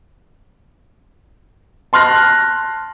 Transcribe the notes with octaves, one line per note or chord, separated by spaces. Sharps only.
A5 C6 F6 F#6 A#6